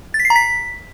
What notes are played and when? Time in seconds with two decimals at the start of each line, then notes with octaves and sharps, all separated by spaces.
0.14 A6
0.20 B6
0.25 C7
0.30 A#5
0.36 B6